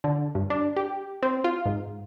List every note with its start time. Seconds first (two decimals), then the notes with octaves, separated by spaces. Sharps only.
0.04 D3
0.35 G2
0.50 D4
0.77 G4
1.22 C4
1.44 F4
1.66 G#2